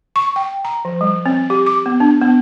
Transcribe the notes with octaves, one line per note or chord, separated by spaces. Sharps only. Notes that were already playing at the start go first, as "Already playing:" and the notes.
C#6
G5
A#5
F3
G3
C4
G4
D6
B3
D4
B3